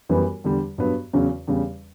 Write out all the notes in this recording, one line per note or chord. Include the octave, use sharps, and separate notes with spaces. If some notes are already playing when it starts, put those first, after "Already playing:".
F#2 E3 G3 B3
E2 D3 G3
G2 F#3 B3
E2 C#3 F#3 C#4
E2 C#3 G3